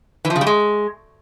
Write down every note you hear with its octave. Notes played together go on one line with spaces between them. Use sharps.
E3
F3
C#3
G3
G#3